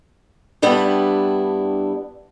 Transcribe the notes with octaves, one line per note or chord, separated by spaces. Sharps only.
G2 G3 B3 D4 E4